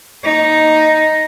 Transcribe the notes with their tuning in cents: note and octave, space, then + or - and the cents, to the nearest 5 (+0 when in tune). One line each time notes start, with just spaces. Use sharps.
A#3 +0 D#4 +0